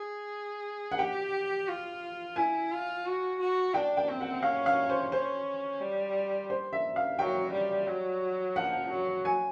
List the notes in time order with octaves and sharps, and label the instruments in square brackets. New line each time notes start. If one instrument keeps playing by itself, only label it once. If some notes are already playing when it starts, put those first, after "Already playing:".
Already playing: [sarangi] G#4
[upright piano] F#5
[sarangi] G4 [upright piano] G5
[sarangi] F4
[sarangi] E4 [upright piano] G#5
[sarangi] F4
F#4
F#4
[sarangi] D4 [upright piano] G5
[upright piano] G5
[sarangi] C4
[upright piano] F#5
[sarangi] C#4 [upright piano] F5
[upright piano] F5
C5
[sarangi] C#4 [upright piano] C5
[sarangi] G3
[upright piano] C5
E5
F5
[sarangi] F#3 [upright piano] G5
[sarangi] G3
F#3
[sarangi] F3 [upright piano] F#5
[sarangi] F#3
[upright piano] G#5